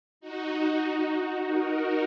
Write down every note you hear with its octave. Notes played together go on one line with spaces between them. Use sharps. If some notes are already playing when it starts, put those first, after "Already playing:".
D#4 F#4
D#4 F#4
F#4 A#4